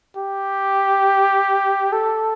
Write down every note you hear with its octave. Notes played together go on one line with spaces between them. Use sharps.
G4
A4